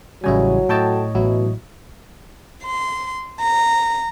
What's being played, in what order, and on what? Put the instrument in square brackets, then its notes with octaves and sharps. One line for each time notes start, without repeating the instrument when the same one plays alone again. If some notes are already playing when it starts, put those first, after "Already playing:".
[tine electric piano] A1 C#3 G3 [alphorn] F#3 [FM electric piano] E4 D#5 G#5
[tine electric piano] A2 C#5 D#5 [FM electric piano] A4 G5 A5
[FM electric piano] A1 F#3 E4 [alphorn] B2
[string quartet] C6
A#5